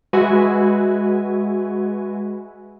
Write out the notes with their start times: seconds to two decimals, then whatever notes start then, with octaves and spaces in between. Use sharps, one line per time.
0.13 G#3 F#4 B4 E5 G#5